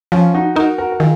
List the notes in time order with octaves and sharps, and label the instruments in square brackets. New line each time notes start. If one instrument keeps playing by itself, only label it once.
[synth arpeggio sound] F3 [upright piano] C#4 F4
[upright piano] D#4 F#4
[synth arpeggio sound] D#4 [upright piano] F#4 A#4
[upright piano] F#4 A#4
A#4
[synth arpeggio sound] D#3 [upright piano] F4 G#4